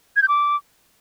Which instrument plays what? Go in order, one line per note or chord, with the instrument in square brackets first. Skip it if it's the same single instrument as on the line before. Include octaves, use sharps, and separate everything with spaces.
[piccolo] G#6
G6
D6